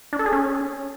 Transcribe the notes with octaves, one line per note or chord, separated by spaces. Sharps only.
D4
A4
G#4
C#4